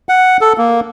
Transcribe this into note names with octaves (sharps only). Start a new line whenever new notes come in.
F#5
A4
A#3